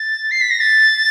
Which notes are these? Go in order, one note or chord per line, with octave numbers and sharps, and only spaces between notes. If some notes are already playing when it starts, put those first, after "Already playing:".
Already playing: A6
C7
B6
A#6
A6